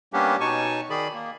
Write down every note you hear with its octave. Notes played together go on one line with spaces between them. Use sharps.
G3 A#3 B3 C#4 D4 G4
B2 D#4 C#5 G#5 A5 C#6
D#3 G#4 D5 B5
A#3